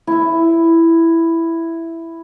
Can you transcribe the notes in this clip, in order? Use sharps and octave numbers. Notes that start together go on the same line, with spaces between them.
E4 E5